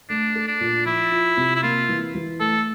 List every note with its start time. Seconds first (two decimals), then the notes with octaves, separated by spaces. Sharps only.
0.10 A3 D4
0.35 A4
0.48 D4
0.60 A#2
0.86 F3 E4
1.12 F4
1.37 C3
1.55 E4
1.63 A#3 F4
1.89 E3
2.15 E3
2.40 A3 A4